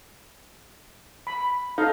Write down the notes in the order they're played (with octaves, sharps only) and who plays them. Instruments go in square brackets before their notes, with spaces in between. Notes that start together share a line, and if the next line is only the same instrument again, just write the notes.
[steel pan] B5
[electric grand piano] D#4 [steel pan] A4 D#5 F5